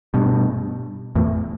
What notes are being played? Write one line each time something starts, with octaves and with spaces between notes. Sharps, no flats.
G2 B2
E2 A2